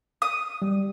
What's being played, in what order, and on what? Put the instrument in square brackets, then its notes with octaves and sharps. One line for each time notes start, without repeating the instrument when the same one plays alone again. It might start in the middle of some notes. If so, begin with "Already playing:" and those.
[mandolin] D#6
[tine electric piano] G3